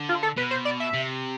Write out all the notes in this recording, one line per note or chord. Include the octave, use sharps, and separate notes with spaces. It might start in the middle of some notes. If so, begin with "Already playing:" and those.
Already playing: D3
F4
A4
B2 B4
C5
D5
E5
C3